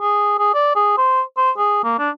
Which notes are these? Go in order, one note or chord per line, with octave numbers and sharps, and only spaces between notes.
G#4
G#4
D5
G#4
C5
C5
G#4
A#3
D4